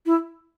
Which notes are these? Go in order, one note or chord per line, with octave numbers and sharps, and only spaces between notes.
E4